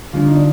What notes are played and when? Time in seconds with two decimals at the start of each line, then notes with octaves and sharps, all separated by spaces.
0.13 D3 G3 D4 F4
0.24 D#4
0.35 D4